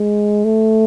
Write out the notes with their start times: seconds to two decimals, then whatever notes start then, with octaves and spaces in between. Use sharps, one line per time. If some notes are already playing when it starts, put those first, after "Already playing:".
Already playing: G#3
0.44 A3